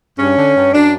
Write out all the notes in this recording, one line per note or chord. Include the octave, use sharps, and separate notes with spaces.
G2 C#4
D3
G2
F#2 D4